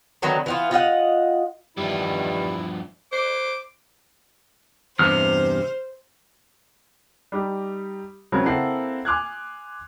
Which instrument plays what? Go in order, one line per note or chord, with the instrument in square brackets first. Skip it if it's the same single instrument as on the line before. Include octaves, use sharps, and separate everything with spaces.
[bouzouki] D3 D#3 F#3 B3
E3 B3 F4
F4 D#5 E5 F#5
[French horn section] E2 D#3 [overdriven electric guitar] G2 F3 [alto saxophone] G3 [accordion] E4
[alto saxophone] C5 [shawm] D6
[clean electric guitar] E2 G2 C3 [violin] C5 [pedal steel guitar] F6
[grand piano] G3 D#4 G4
C#3 F#3 C4 A#4 C#5
A#3 C4 E4 A4 F#5 C7
G#5 C6 D6 F6 F#6 G#6